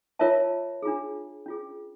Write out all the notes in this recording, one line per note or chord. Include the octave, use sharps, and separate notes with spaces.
F4 A#4 C#5 E5 A5
D4 F4 G#4
C#4 F4 G#4